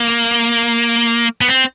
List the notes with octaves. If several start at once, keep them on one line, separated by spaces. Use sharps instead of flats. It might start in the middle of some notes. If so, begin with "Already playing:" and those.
Already playing: A#3
B3
C4